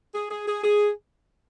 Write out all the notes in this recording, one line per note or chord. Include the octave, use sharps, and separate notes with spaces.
G#4
G#4
G#4
G#4